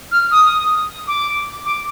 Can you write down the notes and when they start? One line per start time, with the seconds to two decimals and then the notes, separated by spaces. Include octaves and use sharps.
0.12 F6
0.31 D#6
1.08 D6
1.65 D6